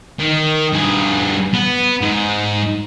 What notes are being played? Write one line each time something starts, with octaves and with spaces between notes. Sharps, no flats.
D#3
G2 G#4
B3
G#2